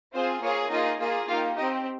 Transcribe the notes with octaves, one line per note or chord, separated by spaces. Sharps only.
C4 F4 G#4 C5
A#3 F4 G#4 C#5
A#3 D#4 F4 G#4 D#5
A#3 F4 G#4
A#3 D#4 F4 G4 F5
C4 D#4 G4 D#5